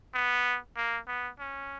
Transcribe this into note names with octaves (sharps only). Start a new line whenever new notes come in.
B3
A#3
B3
C#4